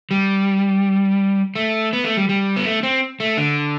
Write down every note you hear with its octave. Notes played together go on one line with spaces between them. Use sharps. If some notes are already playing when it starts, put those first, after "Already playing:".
G3
A3
B3
A3
G3
G3
B3
A3
C4
A3
D3